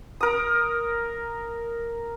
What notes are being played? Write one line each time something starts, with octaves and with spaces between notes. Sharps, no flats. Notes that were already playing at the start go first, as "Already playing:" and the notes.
A#4 D#6